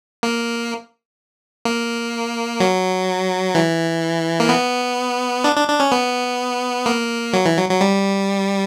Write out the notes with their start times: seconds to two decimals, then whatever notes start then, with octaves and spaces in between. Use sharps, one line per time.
0.23 A#3
1.65 A#3
2.60 F#3
3.55 E3
4.40 A#3
4.49 B3
5.44 D4
5.56 D4
5.68 D4
5.80 C#4
5.92 B3
6.86 A#3
7.33 F#3
7.46 E3
7.57 F#3
7.69 F#3
7.81 G3